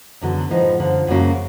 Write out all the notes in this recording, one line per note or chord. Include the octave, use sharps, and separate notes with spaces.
F#2 D3 F#3 B3
A2 F3 G#3 B3 D#4
F#2 D3 F3
F#2 C#3 F#3 A#3 C#4